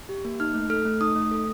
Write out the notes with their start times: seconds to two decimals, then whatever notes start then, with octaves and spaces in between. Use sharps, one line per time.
0.09 G4
0.25 A#3
0.40 D#4 F6
0.54 A3
0.70 A4 F6
0.85 A3
1.01 D#4 D#6
1.16 A3
1.31 A4